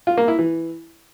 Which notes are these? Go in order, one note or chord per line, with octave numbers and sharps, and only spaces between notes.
F4
A#3
E4
E3